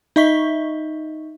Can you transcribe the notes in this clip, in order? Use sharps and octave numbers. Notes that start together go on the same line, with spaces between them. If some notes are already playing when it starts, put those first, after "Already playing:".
D#4 D#5 E5 C#6 B6 G7